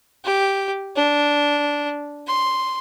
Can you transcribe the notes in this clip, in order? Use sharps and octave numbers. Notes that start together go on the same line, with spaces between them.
G4
D4
C6